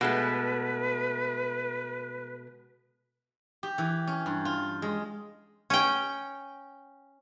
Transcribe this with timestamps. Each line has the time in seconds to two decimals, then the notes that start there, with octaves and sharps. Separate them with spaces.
0.01 B2 G#3 A3 B4
3.63 G4
3.78 E3
4.07 C#4
4.26 G2
4.45 F4
4.82 G#3
5.70 C#4 G5